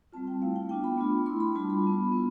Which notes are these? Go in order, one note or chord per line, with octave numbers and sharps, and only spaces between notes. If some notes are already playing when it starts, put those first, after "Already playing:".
G3 C4 F4 A5
G5
A3 E4 F5
G5
B3 D4 F4 G5
B5
A3 D4 F4
A3 E4 C6
B5
G3 D4 F4 A5
B5
B3 F4
B3 E4